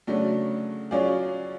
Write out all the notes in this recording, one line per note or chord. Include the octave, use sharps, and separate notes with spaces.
C#3 F#3 A3 D4
F#3 C#4 F4 G#4 D5